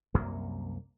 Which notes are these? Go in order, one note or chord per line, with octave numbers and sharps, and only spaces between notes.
C2 F#2 A#3